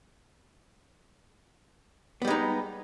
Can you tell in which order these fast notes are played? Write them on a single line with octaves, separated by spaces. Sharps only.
B3 G3 G#3 D#4